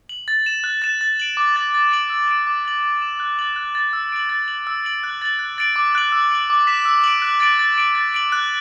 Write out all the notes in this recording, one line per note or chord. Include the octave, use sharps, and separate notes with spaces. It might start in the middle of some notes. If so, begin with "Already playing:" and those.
F#7
A6
E7
F#6
A6 E7
A6
D7 F#7
D6
A6 F#7
A6
D7 F#7
E6
D7 F#7
D6
A6 F#7
A6
E7
F#6
A6 F#7
F#6
A6 F#7
E6
D7 F#7
A6
F#7
E6
D7 F#7
F#6
A6 F#7
F#6
A6 D7 F#7
D6
F#6 D7 F#7
E6
D7 F#7
D6
B6 E7
E6
D7 F#7
F#6
A6 D7 F#7
A6
D7 F#7
A6
D7 F#7
F#6